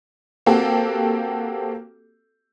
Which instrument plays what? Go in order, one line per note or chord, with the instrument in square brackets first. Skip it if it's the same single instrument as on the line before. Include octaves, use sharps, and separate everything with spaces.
[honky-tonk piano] A#3 C4 F#4 G4 A4